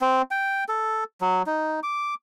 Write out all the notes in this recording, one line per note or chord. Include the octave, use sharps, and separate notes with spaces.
C4
G5
A4
F#3
D#4
D6